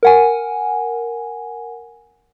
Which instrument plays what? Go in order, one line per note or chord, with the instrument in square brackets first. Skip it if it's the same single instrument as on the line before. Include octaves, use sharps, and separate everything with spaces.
[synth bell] A#4 F#5 G#5